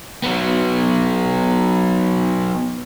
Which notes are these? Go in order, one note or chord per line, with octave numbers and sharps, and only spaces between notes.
F#3 B3